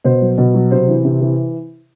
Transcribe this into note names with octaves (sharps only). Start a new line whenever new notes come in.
B2 C5
F#3
B2
F#3
C3 C5
E3
C3
E3